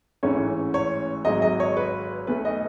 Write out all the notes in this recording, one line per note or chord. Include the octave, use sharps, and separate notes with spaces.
A1 G#2 E3 A3 C#4 C#5
C#5
G#1 G#2 F#3 D#5
D#5
C#5
B4
B1 B2 A3 B4
D#5